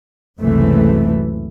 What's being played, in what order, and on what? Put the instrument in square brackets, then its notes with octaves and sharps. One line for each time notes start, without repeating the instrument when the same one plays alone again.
[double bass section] F#1 C#2 C3 E3 A3